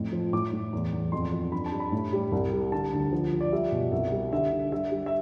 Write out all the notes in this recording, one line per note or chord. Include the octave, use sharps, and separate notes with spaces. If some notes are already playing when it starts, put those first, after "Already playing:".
Already playing: F2 A2
F3
A2 D6
A2
E2
E2
F2 C6
F2
G2 B5
A5
G3
B5
A2
G3
C2
G3
D3 A5
D2
F3
F3
D5
G3 E5
B2
C2 E5
G3
D3 E5
D3
G3 E5
G3
E5